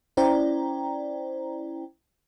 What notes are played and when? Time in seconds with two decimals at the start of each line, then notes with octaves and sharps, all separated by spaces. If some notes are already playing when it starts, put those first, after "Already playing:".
0.17 C#4 E4 C5 D5 G5 A#5